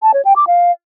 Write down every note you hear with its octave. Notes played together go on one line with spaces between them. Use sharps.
A5
C#5
G5
D6
F5